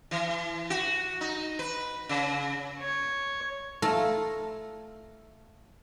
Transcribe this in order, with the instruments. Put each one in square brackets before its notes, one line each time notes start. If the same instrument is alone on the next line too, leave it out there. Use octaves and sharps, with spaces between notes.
[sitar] E3
F#4
D#4
B4
C#3
[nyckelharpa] C#5
[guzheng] A3 F4 A#5